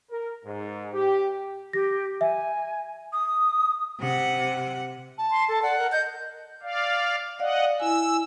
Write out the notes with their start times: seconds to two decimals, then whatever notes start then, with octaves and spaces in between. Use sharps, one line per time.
0.11 A#4
0.45 G#2
0.94 G4
1.73 G4 A#6
2.21 E5 G#5
3.12 D#6
4.00 C3 F#5
5.18 A5
5.31 C6
5.49 A4
5.63 D5 F#5
5.79 A#4
5.92 D#5 G6
6.63 D5 F5
7.39 D5 D#5 F5 F#5
7.80 E4 G#5 E6